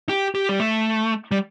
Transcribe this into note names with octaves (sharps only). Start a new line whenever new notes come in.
G4
G4
G3
A3
G3